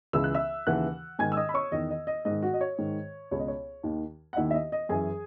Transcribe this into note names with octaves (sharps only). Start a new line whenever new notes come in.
C#2 C#3 E3 E6
F#6
E5 E6
D#2 C#3 E3 F#5 F#6
G#2 D#3 G#5 G#6
E6
D#5 D#6
B5
C#5 C#6
E2 D#3 D#5
D#5
D#5
G#2 D#3 D#5
F#4 F#5
D#5
C#5
G#2 D#3
C#2 B2 C#5
D#5
C#5
D#2 D#3
F#5
D#2 D#3 E4 E5
E5
D#5
D#5
F#2 E3 G#4 G#5